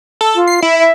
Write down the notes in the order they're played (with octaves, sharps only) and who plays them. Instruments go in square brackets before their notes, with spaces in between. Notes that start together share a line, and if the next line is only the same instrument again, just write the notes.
[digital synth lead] A4
[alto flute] F4
[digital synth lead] C7
[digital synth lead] E4 [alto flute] E5
[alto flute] E5